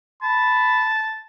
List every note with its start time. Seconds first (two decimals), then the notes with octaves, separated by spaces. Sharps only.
0.23 A5 B5